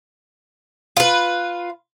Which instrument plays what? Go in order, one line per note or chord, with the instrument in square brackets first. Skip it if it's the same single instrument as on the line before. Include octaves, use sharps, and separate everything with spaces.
[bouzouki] F4 B4